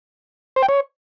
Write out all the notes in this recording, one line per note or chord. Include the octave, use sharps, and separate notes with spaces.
C5
G5
C#5